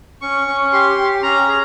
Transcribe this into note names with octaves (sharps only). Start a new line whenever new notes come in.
C#4 C#6
C#4
G4 C6
G4
C#4 A#5
G#4